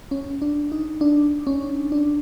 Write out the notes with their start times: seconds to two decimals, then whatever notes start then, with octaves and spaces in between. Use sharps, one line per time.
0.11 C#4
0.42 D4
0.72 D#4
1.01 D4
1.47 C#4
1.92 D4